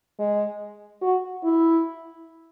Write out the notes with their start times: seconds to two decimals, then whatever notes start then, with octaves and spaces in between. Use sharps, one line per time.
0.19 G#3
1.02 F#4
1.44 E4